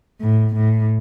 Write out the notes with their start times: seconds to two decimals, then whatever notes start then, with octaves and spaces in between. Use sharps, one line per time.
0.21 A2
0.56 A2